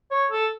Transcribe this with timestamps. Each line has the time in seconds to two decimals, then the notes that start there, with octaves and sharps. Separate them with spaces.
0.11 C#5
0.32 A4